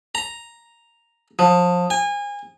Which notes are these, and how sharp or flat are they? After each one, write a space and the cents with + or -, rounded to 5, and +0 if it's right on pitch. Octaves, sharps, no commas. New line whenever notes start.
A#5 +0
F3 +25
G#5 -30